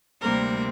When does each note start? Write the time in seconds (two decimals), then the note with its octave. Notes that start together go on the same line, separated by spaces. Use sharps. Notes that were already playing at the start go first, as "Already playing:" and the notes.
0.22 D2 C3 G3 A#3 C4 A#4